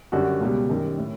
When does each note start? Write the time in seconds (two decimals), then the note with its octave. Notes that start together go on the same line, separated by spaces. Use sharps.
0.12 F#2 D3 G3 F#4
0.41 C#2 B2 G3
0.70 F#2 D#3 G3
0.98 A2